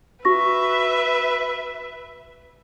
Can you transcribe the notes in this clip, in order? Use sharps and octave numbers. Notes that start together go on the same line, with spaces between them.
F#4 B4 E5 C#6 A#6